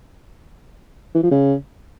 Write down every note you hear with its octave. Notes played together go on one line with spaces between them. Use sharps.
E3
F3
C#3